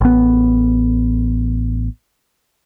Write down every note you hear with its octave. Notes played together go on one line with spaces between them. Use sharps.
A1 B3